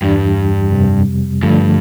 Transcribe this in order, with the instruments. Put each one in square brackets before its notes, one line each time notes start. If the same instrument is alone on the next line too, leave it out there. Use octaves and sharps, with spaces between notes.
[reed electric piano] E2 E3 G3 D4 G4 [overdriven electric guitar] G2
[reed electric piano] F2 C3 G3
[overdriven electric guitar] G2 [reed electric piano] D3 F3 A3